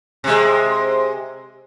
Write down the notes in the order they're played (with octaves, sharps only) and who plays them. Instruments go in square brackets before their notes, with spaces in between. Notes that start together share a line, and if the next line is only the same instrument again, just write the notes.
[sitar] C3 G#3